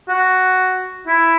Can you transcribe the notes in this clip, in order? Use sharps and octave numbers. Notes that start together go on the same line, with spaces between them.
F#4
E4